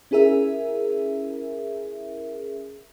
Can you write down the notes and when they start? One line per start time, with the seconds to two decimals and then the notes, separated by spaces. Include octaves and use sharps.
0.11 C#4 E4 G#4 A#4 E5